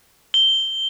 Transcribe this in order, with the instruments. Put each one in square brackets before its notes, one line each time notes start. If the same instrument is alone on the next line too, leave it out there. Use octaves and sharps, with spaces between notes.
[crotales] G7